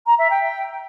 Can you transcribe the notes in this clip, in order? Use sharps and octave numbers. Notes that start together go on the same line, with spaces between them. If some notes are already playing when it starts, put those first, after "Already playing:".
A#5
E5
G5